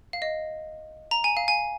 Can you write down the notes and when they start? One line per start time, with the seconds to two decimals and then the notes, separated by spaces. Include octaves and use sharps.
0.13 F5
0.22 D#5
1.11 A#5
1.24 G#5
1.37 F5
1.48 G#5